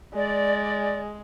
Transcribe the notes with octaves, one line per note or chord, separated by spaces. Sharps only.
G#3 D5